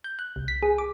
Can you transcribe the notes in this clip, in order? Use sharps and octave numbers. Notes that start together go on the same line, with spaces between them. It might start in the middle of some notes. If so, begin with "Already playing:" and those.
G6
F#6
C2
B6
G#4
D6